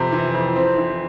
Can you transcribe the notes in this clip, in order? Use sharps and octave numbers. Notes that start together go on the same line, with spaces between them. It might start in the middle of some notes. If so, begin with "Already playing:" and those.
Already playing: F2 C3
E3
F2
C4
E3